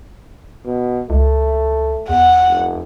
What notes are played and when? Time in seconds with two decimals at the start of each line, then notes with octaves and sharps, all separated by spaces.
0.65 B2
1.10 C#2 A3
2.09 E2 F#5
2.48 F1